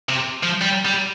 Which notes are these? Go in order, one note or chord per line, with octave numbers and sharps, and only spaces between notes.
C3
F3
G3
G3